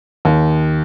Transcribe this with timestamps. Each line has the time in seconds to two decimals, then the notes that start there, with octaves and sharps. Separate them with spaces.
0.25 D#2